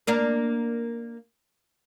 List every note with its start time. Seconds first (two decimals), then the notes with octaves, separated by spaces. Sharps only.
0.07 A#3 D4 A#4